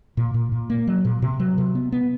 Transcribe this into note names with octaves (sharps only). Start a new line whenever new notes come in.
A#2
A#2
A#2
A#3
F#3
A#2
C3
F#3
C3
B3
B3